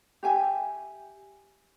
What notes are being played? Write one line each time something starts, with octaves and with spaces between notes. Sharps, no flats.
G4 E5 G#5